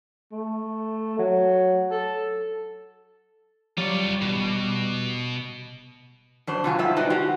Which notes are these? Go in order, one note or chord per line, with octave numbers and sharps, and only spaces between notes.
A3
F#3
A4
F#3 G3 F4 C#5
E1 B2
F#2 D4 C5
C3 F#3 F4 G#5
G#2 G3 F4 E5
D4 D#4 B4 C5 D5 D#5
G#3 F#4 G4